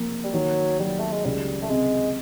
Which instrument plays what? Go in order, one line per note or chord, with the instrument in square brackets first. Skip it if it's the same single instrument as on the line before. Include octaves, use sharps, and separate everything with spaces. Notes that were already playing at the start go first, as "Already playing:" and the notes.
Already playing: [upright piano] F3 A#3
[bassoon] G3
[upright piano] D#3 [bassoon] F#3
[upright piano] F#3 [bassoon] G3
[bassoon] A3
G#3
[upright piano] C#2 [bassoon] G3
[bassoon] A3
[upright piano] C3 [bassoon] G#3